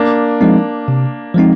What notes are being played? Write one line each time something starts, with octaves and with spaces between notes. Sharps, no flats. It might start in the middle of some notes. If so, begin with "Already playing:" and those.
Already playing: A#3 D4
F3 G#3 C4 D#4
C3
F3 G#3 C4 D#4